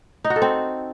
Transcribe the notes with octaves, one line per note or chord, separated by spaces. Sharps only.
D#4
F#4
A4
C4